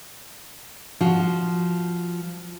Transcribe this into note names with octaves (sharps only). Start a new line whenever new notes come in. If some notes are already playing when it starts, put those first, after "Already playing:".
F3 F#4